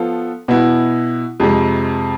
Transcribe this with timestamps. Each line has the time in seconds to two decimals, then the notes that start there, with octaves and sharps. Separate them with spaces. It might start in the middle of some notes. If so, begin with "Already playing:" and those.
Already playing: F3 B3 F4 A4
0.48 B2 B3 E4
1.40 F2 C3 G#3